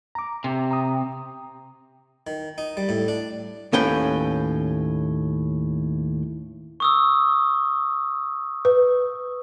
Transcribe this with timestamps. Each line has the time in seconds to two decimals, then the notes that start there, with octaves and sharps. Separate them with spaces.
0.15 A#5 D6
0.44 C3
0.71 A#5 D#6
2.27 D#3
2.58 D#4
2.77 G3
2.89 A2
3.08 D4
3.73 D#2 A2 C#4 B4 G5
6.80 C#6 D#6 E6
8.65 B4